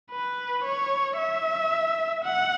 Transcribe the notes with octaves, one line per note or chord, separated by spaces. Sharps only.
B4
C#5
E5
F#5